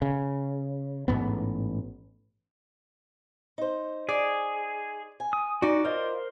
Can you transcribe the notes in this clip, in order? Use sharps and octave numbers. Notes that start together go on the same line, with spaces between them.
C#3
A1 G#2 B2 B3
D#4 C5
G#4 D5
G#5
D#6
D#4 F#4 D5
F4 A#4 C5 D#5